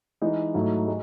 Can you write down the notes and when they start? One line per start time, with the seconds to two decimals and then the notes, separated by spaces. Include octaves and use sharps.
0.21 E3 G#3 D#4
0.54 G#2 F#3 A3 E4
0.88 G#3